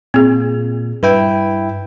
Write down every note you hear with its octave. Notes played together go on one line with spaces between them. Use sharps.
A#2 C4 G#4
G2 E4 B4 G5